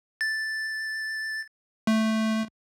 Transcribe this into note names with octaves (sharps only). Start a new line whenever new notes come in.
A6
A3